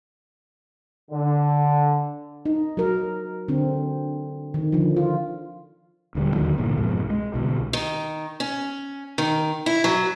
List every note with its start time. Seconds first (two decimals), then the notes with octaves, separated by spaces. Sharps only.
1.11 D3
2.46 D#4
2.77 F#3 A#4
3.48 D3 C4
4.54 D#3
4.72 D3 F3
4.96 F4
6.15 D#1 D3 D#3 G3
6.35 D#2 D3 D#3 F#3
6.58 G1 A#2 D3 E3
6.77 C2 F2 G#2 B2
7.10 G#3
7.34 C2 B2 D3
7.73 D#3
8.40 C#4
9.18 D#3
9.66 E4
9.84 F#3